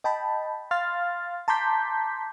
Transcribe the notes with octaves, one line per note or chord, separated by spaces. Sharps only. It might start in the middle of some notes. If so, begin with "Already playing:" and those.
D#5 G5 A5 B5
F5 C6 F6 A6
A5 A#5 C6 D6 G6 B6